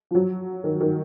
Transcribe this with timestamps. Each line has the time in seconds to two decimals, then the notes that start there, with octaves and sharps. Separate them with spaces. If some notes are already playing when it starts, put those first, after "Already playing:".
0.11 F3
0.15 F#3
0.64 D#3
0.80 D#3